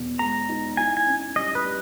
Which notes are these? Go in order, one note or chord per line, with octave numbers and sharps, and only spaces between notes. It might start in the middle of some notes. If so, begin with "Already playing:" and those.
Already playing: E2 B2
G#3 A#5
D#4
E4 G#5
G#5
C#4
G3 D#5
B4
G3